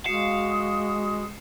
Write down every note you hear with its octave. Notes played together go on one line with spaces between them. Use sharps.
G#3 F#4 F5 D#6 C7 C#7 E7